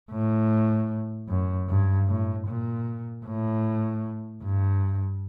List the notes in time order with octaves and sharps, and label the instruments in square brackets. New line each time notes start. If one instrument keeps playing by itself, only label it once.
[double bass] A2
F#2
G2
A2
A#2
A2
G2